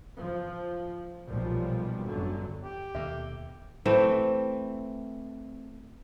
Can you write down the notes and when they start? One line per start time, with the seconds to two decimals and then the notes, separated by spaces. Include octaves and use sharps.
0.16 F3
1.26 B1 A#2 F3 G3
2.07 G1 F#2 D3 F#3
2.63 G4
2.95 D#2 B2 A#3 A4 E5
3.86 E3 A3 C4